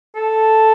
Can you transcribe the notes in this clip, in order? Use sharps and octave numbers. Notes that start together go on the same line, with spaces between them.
A4